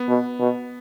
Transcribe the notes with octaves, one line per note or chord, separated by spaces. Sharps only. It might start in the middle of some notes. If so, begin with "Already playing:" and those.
Already playing: B3
B2
B2